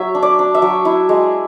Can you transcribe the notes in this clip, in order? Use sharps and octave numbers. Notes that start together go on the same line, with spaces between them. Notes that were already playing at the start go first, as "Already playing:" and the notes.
Already playing: F#3 E5
D4
D5
D4
E5
F#3
E4
G#3